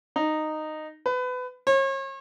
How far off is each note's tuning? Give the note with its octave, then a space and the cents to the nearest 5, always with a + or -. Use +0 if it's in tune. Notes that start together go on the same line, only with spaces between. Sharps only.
D#4 -10
B4 +25
C#5 -40